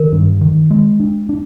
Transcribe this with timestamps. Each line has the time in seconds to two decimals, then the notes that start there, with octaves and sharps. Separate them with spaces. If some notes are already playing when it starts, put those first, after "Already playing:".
Already playing: D#3 A#4
0.12 G2
0.41 D#3
0.71 G#3
1.00 D4
1.29 D4